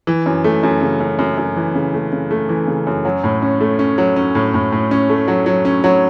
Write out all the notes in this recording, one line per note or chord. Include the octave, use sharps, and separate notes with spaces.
E3
F#2
A3
F#2
C#3
F#2
F#2
F#2
E3
C#3
A3
C#3
A3
E3
C#3
F#2
F#3
A2
C#4
A3
C#4
F#3
C#4
A2
A2
A2
C#4
A3
F#3
F#3
C#4
F#3